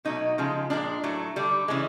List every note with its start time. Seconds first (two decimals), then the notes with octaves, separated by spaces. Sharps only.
0.05 B2 F#3 A3 D#4
0.38 C#3 F3 G#3
0.70 A#2 F3 G#3 D4
1.04 A2 F#3 A3
1.36 D3 G3
1.68 C#3 E3 G#3